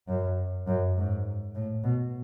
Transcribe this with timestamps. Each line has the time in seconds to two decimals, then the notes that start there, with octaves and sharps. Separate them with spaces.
0.08 F#2
0.67 F#2
0.96 G#2
1.55 A2
1.84 B2